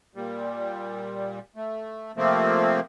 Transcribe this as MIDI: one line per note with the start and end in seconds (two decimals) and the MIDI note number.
0.15 1.39 46
0.15 1.39 55
1.56 2.12 57
2.17 2.80 48
2.17 2.80 53
2.17 2.80 57
2.17 2.80 58
2.17 2.80 60